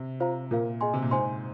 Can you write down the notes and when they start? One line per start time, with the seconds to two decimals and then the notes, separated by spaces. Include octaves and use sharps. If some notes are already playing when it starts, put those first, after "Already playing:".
Already playing: C3
0.20 F4 C5 F5 A#5
0.51 A#2 F4 A#4 F5
0.81 G#4 D#5 G#5 C6
0.93 C3
1.02 A#2
1.11 G#2 C5 G#5 C6